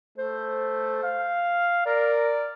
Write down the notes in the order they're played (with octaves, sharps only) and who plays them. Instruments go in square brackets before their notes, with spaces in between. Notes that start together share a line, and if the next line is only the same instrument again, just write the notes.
[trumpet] A3 [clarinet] C5
[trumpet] F5
[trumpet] A#4 [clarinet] D5